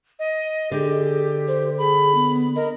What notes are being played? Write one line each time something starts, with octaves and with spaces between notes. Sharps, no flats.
D#5
D3 G4 G#4
C5
G#4 B5
B3
A#4 D#5